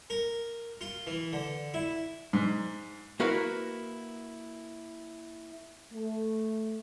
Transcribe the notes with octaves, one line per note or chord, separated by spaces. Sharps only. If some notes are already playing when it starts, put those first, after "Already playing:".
A#4
F4
E3
D3
E4
G#2
A#3 E4 F#4 A#4 B4
A3